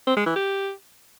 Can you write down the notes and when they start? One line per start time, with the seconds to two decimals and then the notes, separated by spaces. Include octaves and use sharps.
0.07 C4
0.17 G#3
0.26 E3
0.36 G4